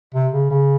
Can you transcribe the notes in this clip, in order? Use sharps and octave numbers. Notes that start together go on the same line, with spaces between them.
C3
C#3
C#3